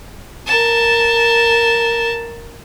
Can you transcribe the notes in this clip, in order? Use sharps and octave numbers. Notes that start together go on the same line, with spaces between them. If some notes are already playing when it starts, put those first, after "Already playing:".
A#4 A5